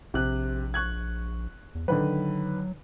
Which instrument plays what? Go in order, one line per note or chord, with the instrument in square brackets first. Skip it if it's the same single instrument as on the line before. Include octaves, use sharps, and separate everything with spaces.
[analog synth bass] A#1 [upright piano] C3 F#6
[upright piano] C#6 F#6 G#6
[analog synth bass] E2
[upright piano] D3 D#3 B4 [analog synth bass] F#3